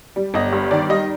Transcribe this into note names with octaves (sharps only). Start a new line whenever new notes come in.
G3
G1 D#5
G2
D#3 D5
G3 D#5